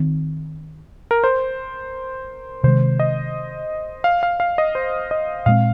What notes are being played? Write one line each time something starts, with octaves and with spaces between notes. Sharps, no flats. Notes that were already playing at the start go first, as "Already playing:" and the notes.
Already playing: D#3 C4
A#4
C5
C3 D#3 G#3 C5
D#5
F5
F5
F5
D#5
C5
D#5
A#2 G#3 C4 F5